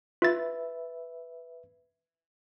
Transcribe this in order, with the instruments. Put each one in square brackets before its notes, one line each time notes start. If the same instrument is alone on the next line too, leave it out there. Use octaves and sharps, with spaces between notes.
[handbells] F4 A6 [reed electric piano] B4 E5